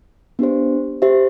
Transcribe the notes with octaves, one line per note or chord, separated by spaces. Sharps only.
B3 D4 G4 C5
G4 C5 E5